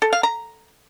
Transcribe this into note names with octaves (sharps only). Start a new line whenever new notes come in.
A4
F5
A#5